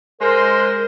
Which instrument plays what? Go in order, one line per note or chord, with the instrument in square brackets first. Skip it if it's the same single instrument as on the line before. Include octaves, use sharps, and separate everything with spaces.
[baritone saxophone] G#3 [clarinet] A#4 [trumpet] C5